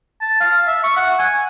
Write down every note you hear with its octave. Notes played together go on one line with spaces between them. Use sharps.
A5
F5
E5
C#6
F#5
G#5